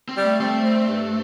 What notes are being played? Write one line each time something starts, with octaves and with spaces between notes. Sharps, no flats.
C4
G3
A3
A3 C4
C4
G2